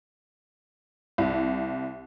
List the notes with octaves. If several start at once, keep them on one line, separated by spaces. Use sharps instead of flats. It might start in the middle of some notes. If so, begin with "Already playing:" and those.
C2